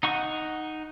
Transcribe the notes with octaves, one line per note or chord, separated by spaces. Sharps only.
D#4 F#5 C#6